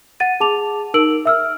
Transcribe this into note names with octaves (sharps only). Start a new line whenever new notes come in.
F#5 A6 D#7
G#4 A5 D6 F7
D#4 A#4 E6 D7 F#7
E5 E6 F6